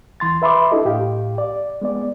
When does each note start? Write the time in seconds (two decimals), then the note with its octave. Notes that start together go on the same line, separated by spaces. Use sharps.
0.20 D#2 E3 C6 A6
0.42 B4 E5 B5 C6 D6
0.71 D4 E4 G4 A4 D#5
0.85 A2 G4 F5
1.38 D5
1.81 G#3 B3 D5